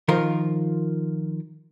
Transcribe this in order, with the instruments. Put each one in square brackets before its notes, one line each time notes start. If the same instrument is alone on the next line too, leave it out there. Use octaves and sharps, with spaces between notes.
[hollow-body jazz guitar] D#3 F3 F4 A#4